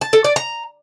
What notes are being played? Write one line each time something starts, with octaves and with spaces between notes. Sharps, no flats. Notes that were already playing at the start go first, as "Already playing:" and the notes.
A5
A4
D5
A#5